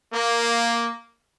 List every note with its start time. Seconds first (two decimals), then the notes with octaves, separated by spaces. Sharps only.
0.14 A#3